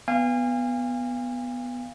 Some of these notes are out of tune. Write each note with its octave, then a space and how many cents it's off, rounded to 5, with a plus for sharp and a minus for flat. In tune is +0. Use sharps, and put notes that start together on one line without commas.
B3 +0 F5 -15 G#5 -40